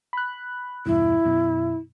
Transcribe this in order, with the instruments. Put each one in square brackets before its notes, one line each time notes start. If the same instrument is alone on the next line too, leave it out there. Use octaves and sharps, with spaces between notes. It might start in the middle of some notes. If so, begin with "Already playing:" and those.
[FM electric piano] B5 F#6
[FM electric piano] E2 G2 B2 [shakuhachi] E4
[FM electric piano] F#2 B2